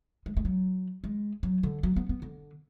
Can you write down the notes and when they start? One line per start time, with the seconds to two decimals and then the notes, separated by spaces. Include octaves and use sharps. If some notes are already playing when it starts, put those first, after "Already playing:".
0.26 G#3
0.37 G#3
0.45 F#3
1.04 G#3
1.43 F#3
1.63 D3
1.83 F#3
1.96 B3
2.09 B3
2.22 D3